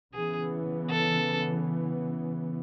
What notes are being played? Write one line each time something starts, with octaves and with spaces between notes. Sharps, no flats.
C#3 E3 B3 G#4
A4